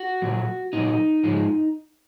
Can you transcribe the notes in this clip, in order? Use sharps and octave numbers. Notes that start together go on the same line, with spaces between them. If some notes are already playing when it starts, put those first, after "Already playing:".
Already playing: F#4
A#2 F#3
A#2 F#3 D#4
G#2 F3 G#3